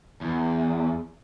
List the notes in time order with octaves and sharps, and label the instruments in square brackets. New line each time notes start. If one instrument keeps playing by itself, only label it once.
[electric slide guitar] E2